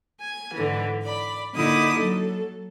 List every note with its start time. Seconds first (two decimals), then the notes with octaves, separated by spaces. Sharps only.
0.21 G#5
0.54 G#2 D3 E3
1.02 D5 B5
1.53 A#2 D3 D#4 E4 D6 D#6
1.98 F#3 A4